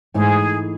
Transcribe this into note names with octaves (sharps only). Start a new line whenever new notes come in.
G#2 E3 A3 G#4